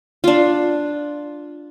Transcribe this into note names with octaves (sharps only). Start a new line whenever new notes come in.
D4 F4